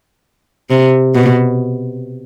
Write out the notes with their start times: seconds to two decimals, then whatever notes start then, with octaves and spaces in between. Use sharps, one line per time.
0.70 C3
1.15 B2